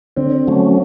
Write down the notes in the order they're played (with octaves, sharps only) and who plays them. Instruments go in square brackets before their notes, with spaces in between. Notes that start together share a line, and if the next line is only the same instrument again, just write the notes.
[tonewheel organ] D3 [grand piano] C4
[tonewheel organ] F#3 A3 C#4